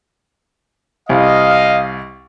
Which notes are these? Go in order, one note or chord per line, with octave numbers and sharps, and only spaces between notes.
C2 D#5 F5